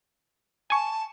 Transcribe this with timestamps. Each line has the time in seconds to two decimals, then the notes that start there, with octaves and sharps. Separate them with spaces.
0.70 G#5 A5 C#6